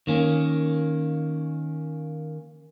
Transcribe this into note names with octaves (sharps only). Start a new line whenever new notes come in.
D#3 A#3 C#4